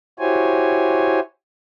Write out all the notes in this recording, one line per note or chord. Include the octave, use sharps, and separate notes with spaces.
E4 F#4 G4 C5 C#5 G#5